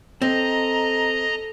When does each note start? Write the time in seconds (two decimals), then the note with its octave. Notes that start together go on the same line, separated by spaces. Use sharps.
0.22 C4 A4 D#5 A#5